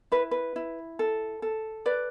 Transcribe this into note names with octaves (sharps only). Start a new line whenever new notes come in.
E4 B4
B4
E4
A4
A4
B4 D5